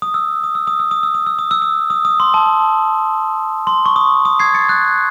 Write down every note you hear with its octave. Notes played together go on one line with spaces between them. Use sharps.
D#6
E6
D#6
E6
D#6
E6
D#6
E6
D#6
E6
D#6
E6
D#6
D#6
D#6
C6
A5
C6
C#6
D#6
D#6
G#6 C7
A6 C#7
F#6 A6